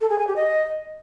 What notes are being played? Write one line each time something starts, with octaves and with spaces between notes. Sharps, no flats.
A4
G#4
G#5
G4
D#5